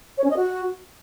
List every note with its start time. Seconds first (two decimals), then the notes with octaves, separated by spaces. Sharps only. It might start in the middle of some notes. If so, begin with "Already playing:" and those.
0.18 C#5
0.24 C#4
0.30 D#5
0.37 F#4